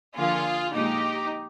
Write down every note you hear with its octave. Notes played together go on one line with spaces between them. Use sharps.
D3 F3 A#3 F4 G#4
A#2 F3 G#3 D#4 G4